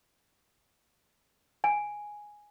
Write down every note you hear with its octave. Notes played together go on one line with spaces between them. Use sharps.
G#5